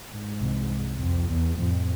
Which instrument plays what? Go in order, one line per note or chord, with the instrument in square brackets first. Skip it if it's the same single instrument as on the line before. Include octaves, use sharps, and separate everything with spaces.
[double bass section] G#2
[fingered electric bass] C2 C3 E3
[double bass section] F2
E2
[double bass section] F2 [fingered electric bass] A2 F3 A3